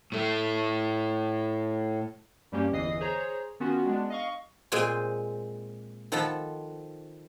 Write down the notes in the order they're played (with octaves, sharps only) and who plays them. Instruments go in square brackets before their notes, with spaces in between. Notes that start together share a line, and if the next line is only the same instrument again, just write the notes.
[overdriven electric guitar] A2 A3
[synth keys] G2 G3 A#3 C#4 G4
G1 E2 E3 D#5 D#6 C7
G#4 C5 C#5 A#5
D#3 B3 C#4 F4 F#4
G#3 B3 D4
D#5 F5 C#6
[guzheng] A#2 G#3 C4 C5 G5 G#5
D#3 F3 A4 F#5 A5 B5